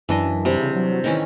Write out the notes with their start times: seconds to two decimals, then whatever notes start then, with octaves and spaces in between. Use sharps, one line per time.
0.09 F#2 E3 D4 D#5
0.45 C3 G3
0.59 C#3
0.76 F#3
1.04 A2 D#3 E3 C#4